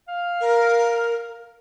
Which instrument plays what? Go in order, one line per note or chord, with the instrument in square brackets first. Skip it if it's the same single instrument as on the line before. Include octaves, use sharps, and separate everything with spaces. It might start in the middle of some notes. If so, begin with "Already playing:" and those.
[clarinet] F5
[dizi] A#4